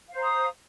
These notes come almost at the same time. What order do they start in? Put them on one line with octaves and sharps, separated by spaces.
F5 C5 A#5 D#6